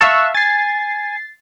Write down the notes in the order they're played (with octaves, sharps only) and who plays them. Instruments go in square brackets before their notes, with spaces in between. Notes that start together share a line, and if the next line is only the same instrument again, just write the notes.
[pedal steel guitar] E5 F5 A5 [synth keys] C#6 E6 F#6
[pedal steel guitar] G#5 [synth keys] A6 C7